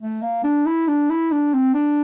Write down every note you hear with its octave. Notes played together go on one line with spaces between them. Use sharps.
A3
A#3
D4
E4
D4
E4
D4
C4
D4